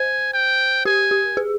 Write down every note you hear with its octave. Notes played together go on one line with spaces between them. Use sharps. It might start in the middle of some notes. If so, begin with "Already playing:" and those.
Already playing: C5 G#5
G5
G4 G#5
G4
G#4